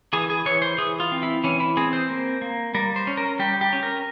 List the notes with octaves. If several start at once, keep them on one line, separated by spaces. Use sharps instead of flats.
E3 G#4
G#4
E3 C#5
C5
E3 G#4
F4
C4
E4
E3 C#4
E4
C4 G#4
C5
A#3
A#3
G3 A#4
C5
C#4
A#4
G3 G4
G4
C#4
A#4